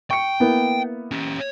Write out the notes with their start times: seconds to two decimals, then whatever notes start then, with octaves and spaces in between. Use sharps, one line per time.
0.11 G5 C#6 C#7
0.40 A#3 B3 E4
1.11 C#4 G4